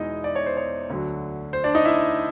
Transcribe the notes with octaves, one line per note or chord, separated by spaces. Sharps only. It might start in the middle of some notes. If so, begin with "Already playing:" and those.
Already playing: E2 B2 G#3 D#4 E4 D#5 E5
D5
C#5
C5
C#5
D2 D3 F#3
C5
D4 D5
D#4 D#5
E4 E5